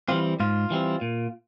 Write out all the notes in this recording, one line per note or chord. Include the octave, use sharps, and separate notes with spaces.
E3 G3 C4 F4
G#2 F4
E3 G3 C4
A#2